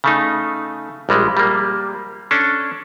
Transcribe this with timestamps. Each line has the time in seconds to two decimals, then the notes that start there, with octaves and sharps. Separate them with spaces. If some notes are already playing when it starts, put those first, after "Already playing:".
0.04 C#3 A3 D#4
1.09 A#1 G3 G#3
1.37 G3 A#3
2.31 C#4 D4 A4